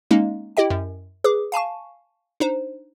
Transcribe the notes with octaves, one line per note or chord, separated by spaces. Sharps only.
G#3 A#3 C#4 D#4
E4 G4 D#5 G5
F#2
G#4 B4 D6
F5 G#5 A5 C#6
D4 D#4 C5